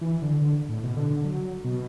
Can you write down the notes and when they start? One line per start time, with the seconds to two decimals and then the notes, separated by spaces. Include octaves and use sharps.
0.01 E3
0.22 D3
0.41 D3
0.69 A2
0.83 B2
0.96 D3
1.11 D3
1.24 F#3
1.64 B2